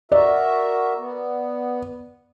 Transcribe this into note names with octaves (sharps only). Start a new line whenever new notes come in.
F#4 A#4 D5 E5
B3